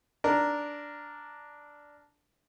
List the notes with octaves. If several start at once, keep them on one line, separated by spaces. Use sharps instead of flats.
D4 A#4